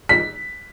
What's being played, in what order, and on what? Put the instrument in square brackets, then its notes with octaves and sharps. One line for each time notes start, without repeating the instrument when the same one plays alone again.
[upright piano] B6